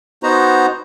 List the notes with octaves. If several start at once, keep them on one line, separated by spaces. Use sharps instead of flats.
B3 D#4 F#4 C5 A#5